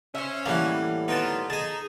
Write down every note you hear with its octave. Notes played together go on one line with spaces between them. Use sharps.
C#4 C5 E5
A2 E3 G3 A#3 F#5
A#3 B3 D#4 F4 G5 A5
D#4 G#4 G#5 A5